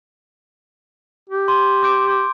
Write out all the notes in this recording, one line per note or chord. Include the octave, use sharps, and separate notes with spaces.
G4
C6
D6 G6 D7